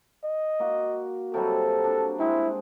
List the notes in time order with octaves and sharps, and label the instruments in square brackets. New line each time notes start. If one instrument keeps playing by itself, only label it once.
[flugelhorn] D#5
[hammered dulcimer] A#3 F#4
[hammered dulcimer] C3 F#3 G3 [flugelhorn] A4
[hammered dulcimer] D4
[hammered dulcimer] G#3 C4 [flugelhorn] E4